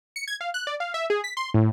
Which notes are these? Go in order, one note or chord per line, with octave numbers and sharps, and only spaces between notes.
C#7
G#6
F5
F#6
D5
F5
E5
G#4
B6
C6
A2